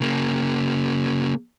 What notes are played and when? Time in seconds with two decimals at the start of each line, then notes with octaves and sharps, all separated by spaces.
0.01 C#3 A#3